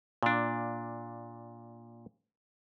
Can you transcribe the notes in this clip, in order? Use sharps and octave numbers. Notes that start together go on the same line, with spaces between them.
A#2 D4